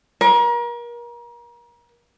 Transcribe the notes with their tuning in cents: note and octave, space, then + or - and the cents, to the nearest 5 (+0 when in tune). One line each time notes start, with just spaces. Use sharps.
A#4 +35